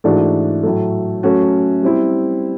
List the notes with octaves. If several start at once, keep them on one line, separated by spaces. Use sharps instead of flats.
G#2 E3 A3 D4 F#4
A2 F#3 A3
F#3 A3 C#4 F#4
G3 C4 E4